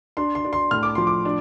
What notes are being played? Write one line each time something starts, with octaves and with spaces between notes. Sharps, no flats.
D4 C6
C6
D4
C6
A2 F6
D6
F3 C6
D6
D4